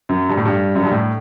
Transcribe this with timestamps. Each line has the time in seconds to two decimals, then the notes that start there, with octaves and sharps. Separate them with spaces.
0.09 F#2
0.29 G2
0.37 A2
0.45 G2
0.75 F#2
0.84 G2
0.91 A2